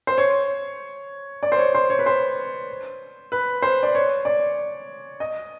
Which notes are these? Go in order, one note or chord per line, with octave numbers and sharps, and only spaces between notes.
C5
C#5
D5
C5
C#5
C5
C#5
B4
C5
B4
C5
D5
C#5
D5
D#5